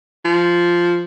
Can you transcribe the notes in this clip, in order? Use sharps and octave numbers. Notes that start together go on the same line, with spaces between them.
F3